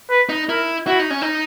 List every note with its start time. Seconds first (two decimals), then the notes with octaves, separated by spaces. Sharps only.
0.10 B4
0.29 D#4
0.49 E4 A#4
0.87 E4 F#4
0.99 D#4
1.10 C#4
1.22 D#4